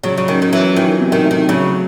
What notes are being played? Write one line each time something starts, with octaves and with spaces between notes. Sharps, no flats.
C#3 F#3
C#3
D#3 C#4
D#3
E3 F#3
D#3 E3
C3
D#3
A3
D#3
C#3 F#3